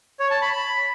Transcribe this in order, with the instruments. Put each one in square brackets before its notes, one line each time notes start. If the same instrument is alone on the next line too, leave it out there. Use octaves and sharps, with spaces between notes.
[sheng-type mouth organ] C#5
A5
B5
B5